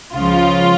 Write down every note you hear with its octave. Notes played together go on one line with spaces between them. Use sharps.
C#2 C#3 F3 F4